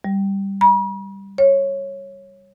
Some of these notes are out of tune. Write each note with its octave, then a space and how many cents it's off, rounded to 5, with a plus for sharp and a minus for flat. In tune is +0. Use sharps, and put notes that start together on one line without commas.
G3 +5
B5 -45
C#5 -10